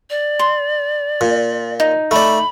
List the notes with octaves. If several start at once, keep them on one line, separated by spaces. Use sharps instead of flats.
D5
C6
A#2
D#4
A3 D5 B5